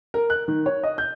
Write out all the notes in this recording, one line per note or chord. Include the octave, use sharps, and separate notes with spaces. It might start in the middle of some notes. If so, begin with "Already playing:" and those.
A#4
F#6
D#3
C#5
D#5
G6